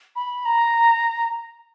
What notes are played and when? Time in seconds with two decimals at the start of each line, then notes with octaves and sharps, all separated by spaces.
0.15 B5
0.45 A#5